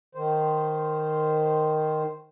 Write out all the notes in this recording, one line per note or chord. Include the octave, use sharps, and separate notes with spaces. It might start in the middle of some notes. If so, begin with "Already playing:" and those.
D#3 C5